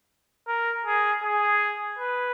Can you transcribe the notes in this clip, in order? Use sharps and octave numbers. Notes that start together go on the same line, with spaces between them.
A#4
G#4
G#4
B4